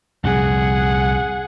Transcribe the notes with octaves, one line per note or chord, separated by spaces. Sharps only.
C2 F2 A#2 G#4 F#5